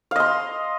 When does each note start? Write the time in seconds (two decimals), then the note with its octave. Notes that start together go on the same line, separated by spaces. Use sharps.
0.11 F5
0.16 D#5
0.20 C6